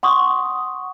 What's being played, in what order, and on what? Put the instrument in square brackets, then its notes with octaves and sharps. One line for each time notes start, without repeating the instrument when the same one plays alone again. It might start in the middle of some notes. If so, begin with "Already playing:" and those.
[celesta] F#5 C6 C#6 D#6